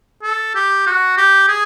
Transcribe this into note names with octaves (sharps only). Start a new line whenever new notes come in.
A4
G4
F#4
G4
G#4